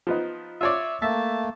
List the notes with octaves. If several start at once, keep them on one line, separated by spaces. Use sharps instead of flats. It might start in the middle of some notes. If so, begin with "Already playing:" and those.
F3 B3 D#4
F4 C#5 D5 E5
A3 A#3 E5 A5